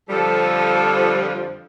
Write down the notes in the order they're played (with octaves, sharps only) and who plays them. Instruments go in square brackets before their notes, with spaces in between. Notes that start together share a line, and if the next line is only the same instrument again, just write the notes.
[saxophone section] F2 D3 F3 [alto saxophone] G3 [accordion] A4